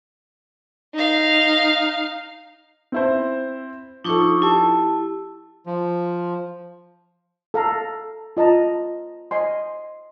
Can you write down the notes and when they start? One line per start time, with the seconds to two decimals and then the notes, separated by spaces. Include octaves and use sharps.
0.94 D#4 F5
2.92 C4 E4 C5
4.04 F3 D4 D#4 A4 C#6
4.42 E4 G4 A5
5.66 F3
7.54 A4 F5 A#5
8.37 F4 D#5 A5 A#5
9.31 D#5 G#5 C6